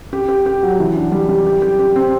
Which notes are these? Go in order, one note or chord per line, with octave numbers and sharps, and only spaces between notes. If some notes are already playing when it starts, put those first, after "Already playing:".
G4
G4
G4
F#3
E3
D4
G3
G3
G4
G4
G4
C4